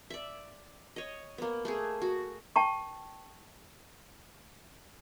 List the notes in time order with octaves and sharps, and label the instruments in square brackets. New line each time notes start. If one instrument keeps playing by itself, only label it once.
[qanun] D5 E5
C#5 D#5
A#3 B3
A3 A#3 G#4
F#4
[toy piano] G5 A5 C#6